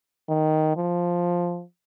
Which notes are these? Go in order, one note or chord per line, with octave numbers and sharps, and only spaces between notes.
D#3
F3